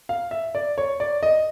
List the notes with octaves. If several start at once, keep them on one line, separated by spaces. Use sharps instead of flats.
F5
E5
D5
C#5
D5
D#5